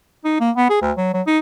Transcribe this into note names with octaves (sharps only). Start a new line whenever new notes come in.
D#4
A#3
B3
G#4
D2
F#3
F#3
D#4